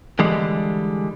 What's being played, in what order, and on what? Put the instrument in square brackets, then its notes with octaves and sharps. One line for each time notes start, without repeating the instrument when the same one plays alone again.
[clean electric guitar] D3 E3 G3 G#3